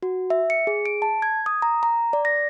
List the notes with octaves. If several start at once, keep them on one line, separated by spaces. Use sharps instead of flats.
F#4
E5
C#7
G#4
D7
A5
G#6
D#6
A#5
A#5
D5
A#6